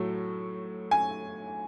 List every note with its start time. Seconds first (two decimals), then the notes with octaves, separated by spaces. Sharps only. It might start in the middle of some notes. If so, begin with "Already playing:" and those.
Already playing: A2 F#3 A3
0.91 G#5